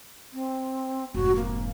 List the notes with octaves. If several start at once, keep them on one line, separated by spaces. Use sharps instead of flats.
C4
F1 G#2 F#4
A#3